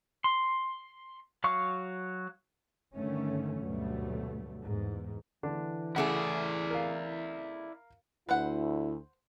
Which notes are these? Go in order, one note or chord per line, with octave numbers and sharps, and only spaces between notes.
C6
F#3 F5 C#6
G2 D3 D#3 A3 C#4
D2 G2 B2 F#3 G3 A3
E2 G#2
D3 E3 D4
C#3 A3 E4 G#4 D5 F#5
A#4 F5
D2 E4 B4 C5 F#5